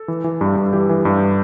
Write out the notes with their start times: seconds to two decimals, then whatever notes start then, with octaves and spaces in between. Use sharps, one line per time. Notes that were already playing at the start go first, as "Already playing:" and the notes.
Already playing: A4
0.08 E3
0.24 E3
0.41 G2
0.57 G2
0.73 E3 G4
0.89 E3
1.05 G2